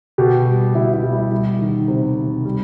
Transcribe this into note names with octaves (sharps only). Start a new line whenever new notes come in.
B2 G4
G3
B2 E4
E4
G3
E4
G3
D#3
C3
C3
G3